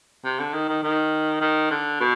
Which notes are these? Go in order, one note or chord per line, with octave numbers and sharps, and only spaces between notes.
C3
D3
D#3
D#3
D#3
D#3
D3
B2